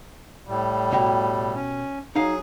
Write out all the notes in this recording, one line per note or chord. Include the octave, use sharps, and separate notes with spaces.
A2 G3
B2 G4 A#5
C#4
F#3 D#4 G#4 F5